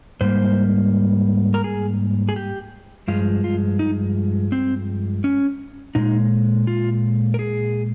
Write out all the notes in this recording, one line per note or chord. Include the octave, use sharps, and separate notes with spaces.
G#2 G3 A#3 C5
A#4
G#4
G#4
G4
G2 F3 G#3 F4
F4
D#4
C4
C#4
A#2 G#3 D#4
F4
A#4
G#4